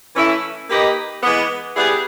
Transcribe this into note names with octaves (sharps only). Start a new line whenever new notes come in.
E3 A3 C#4 E4
A#3 D#4 G4 B4 D#5
E3 G#3 B3
G3 B3 E4 G#4